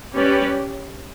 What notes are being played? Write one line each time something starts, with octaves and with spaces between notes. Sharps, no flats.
G3 C#4 G4 B4 D5